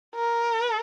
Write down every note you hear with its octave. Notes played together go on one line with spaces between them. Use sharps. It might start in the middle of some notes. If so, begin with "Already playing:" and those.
A#4